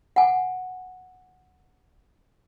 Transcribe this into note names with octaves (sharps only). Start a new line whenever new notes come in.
F#5 G#5